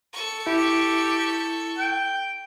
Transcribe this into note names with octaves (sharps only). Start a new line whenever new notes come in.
A4 C#6
E4 G4
G5